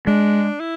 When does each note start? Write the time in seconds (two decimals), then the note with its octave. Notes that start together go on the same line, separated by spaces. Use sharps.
0.07 G#3 D4
0.60 E4